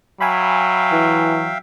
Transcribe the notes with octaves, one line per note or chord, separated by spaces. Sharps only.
F#3 E5 F5 G5 G#5 B5
E3